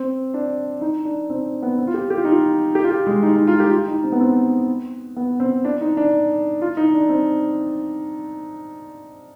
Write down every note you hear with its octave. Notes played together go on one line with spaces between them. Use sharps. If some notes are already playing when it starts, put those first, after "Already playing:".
Already playing: C4
D4
D#4
D4
C4
B3
C4
F4
G4
G4
F4
D#4
F4
G4
F4
G4
G#3
D#4
D#4
F4
G4
F4
D#4
C4
B3
C4
B3
C4
D4
D#4
D4
F4
D#4
D4
C4